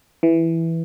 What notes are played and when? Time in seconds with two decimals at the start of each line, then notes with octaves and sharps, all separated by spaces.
0.23 E3